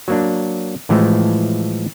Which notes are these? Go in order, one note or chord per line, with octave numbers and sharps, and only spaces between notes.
F#3 A#3 D4
A2 E3 F3 G#3 A3